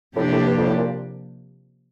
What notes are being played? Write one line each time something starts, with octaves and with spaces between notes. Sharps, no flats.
A2 C3 F3 A#3 D4 G4
A2
G2
F2
A2
A#2